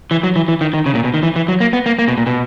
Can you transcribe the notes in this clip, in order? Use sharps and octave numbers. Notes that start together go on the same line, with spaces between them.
E3
F#3
E3
E3
D#3
D#3
C#3
A#2
B2
D#3
E3
E3
F#3
A#3
B3
A#3
A#3
B2
A#2
B2